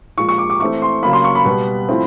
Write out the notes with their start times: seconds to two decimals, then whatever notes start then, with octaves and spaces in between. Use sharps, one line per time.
0.18 A#2 F3 G#3 C#6
0.29 C#6
0.38 D6
0.50 D6
0.60 E3 A3 C4 C#6
0.82 C6
1.03 C#3 F#3 A#3 B5
1.13 C6
1.24 C#6
1.35 B5
1.45 B2 G3 B3
1.89 A2 F3 A3 C4